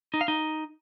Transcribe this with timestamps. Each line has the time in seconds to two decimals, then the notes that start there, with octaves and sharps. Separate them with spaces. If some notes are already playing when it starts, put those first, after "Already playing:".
0.14 D#4
0.21 F5
0.28 D#4